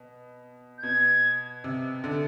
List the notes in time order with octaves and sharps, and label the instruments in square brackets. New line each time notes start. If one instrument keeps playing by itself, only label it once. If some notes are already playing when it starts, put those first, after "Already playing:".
Already playing: [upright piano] B2
[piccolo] G6
[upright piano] B2 [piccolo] G#6
[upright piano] C3
D3